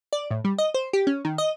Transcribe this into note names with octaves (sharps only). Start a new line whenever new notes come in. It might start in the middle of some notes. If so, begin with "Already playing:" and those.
D5
A2
G3
D#5
C5
G4
C#4
D#3
D#5